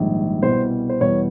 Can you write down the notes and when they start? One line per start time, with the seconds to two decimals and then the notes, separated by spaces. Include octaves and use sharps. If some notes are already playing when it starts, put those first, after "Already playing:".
Already playing: A#1 G#2 D#3 G3
0.42 C2 B2 G3 C5
0.89 C5
1.00 E2 B2 G3 C#5